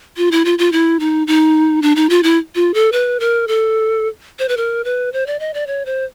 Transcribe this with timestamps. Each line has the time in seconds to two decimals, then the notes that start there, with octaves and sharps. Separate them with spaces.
0.17 F4
0.31 E4
0.45 F4
0.59 F4
0.72 E4
1.00 D#4
1.27 D#4
1.82 D4
1.96 D#4
2.10 F4
2.23 E4
2.55 F4
2.74 A4
2.92 B4
3.20 A#4
3.48 A4
4.39 C5
4.49 B4
4.57 A#4
4.84 B4
5.13 C5
5.27 D5
5.40 D#5
5.54 D5
5.67 C#5
5.86 C5